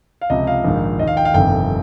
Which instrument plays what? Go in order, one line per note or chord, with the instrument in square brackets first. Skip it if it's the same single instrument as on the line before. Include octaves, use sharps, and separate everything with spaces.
[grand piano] F5
C#2 C3 F3 D#5
F5
A#1 G#2 D#3
D#2 D#5
D#3
F5
G5
F5
G1 F2 C3 D#3 G5